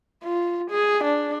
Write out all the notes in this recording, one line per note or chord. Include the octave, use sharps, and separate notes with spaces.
F4
G#4
D4